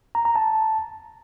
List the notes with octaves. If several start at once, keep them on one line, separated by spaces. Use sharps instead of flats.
A#5
A#5
A5